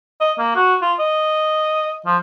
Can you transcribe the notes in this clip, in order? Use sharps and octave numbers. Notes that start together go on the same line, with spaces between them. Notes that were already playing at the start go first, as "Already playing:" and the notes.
D#5
A#3
F#4
F4
D#5
F3